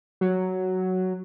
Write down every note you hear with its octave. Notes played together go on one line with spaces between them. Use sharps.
F#3